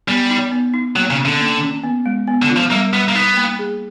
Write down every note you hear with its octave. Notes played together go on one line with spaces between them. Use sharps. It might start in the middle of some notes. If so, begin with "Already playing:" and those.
G3 B3
D#4
B3
D#4
F#3 A#3
C#3
C#4
D3
A#3
C#4
B3
G#3
B3
D3
F4
F3
G3 A#3
G3 B3
A#3
B3 D#4
A#3
G#4